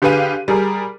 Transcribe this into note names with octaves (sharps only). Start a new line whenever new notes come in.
D3 G4 G#4 B4 F5 D#7
G3 G#4 A#4